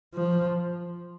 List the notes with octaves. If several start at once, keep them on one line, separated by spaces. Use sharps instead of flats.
F3